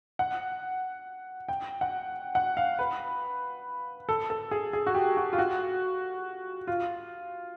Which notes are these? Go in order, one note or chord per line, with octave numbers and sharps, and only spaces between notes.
F#5
G5
F#5
F#5
F5
B4
A4
A4
G#4
G#4
F#4
G4
F#4
F4
F#4
F4